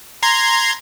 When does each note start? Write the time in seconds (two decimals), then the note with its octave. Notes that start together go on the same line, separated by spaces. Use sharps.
0.23 A#5 C6 G#6